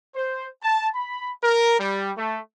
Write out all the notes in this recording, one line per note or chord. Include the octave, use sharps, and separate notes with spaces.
C5
A5
B5
A#4
G3
A3